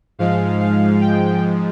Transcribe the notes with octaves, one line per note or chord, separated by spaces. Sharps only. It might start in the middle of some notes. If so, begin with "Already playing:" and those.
G#2 F3 G#3 F5
F5
G5